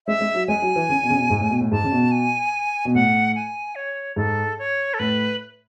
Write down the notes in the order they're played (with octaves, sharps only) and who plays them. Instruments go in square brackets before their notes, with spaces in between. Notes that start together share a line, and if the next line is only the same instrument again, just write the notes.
[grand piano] G#3 [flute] E5
[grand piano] G#3
F#3
[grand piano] G#3 [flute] G#5
[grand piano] F#3
E3
C#3
B2
C#3
B2
G#2
A2
B2
A2
[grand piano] G#2 [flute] A5
[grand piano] C#3
B2
[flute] G#5
[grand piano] B2
[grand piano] A2 [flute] F#5
[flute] G#5
C#5
[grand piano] G#2 [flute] A4
[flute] C#5
A4
[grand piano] A2 [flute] B4